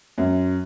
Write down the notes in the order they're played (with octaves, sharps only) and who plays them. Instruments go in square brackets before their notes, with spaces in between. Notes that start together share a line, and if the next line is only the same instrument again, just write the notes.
[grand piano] F#2